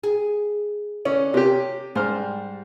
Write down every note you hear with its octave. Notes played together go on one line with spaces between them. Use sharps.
G#4
D3 C#4
C3 C#4 G4
G#2 G3 C5 F6